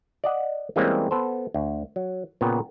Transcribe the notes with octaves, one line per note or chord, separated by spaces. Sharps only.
D5 D#5 F#5
E3 G3 G#3 A#3 C4 C#4
B3 A4 C5
D2
F#3
A#2 C#3 B3 G5